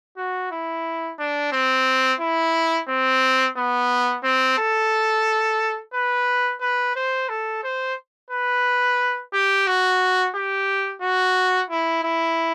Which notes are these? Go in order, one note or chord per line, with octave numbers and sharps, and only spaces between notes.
F#4
E4
D4
C4
E4
C4
B3
C4
A4
B4
B4
C5
A4
C5
B4
G4
F#4
G4
F#4
E4
E4